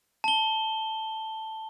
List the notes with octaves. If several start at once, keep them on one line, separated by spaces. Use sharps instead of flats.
A5 G7